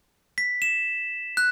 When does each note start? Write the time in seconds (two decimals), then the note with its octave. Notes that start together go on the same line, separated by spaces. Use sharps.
0.38 B6
0.62 E7
1.37 F#6